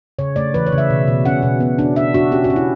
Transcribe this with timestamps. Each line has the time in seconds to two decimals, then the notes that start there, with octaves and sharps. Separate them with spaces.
0.19 C#3 C#5
0.36 A3 D5
0.54 E3 B4
0.66 C#5
0.72 C#3
0.78 E5
0.90 B2
1.08 B2
1.25 C#4 F#5
1.43 B2
1.60 B3
1.79 D4
1.96 D4 E5
2.14 D4 F#4
2.32 C#4 G4
2.44 F#4
2.50 C#4
2.56 E4